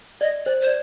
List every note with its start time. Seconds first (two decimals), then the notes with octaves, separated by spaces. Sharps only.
0.21 D5 D#5
0.45 C5 D5
0.61 C5
0.67 D5